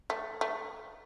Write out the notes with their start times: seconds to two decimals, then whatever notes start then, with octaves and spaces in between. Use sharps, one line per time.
0.10 A3
0.41 A3